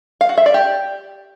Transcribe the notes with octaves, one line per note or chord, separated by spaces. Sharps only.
F5
F#4
E5
D5
G4